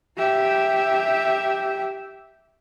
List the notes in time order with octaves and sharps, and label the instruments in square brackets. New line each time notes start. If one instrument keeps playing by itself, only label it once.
[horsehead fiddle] G4 E5